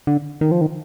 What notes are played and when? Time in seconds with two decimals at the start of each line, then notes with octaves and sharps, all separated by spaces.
0.07 D3
0.41 D#3
0.51 F3
0.61 D#3